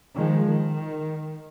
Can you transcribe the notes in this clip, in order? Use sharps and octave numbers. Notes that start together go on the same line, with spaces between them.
D#3 F3 G#3
D#3